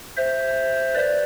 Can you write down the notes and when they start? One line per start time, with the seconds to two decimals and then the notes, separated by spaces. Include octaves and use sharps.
0.17 C5 E5
0.94 B4 D5